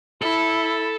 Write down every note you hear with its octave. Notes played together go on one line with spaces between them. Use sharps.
E4 A4